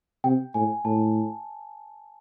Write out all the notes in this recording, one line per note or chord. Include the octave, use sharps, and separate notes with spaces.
C3 G5
A2 G#5
A2 A5